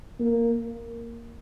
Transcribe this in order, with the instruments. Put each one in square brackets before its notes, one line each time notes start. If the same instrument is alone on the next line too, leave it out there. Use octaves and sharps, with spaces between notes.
[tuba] A#3